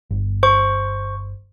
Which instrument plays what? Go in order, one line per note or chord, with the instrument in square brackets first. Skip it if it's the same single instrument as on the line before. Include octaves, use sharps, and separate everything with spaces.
[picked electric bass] G1
[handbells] C5 C#6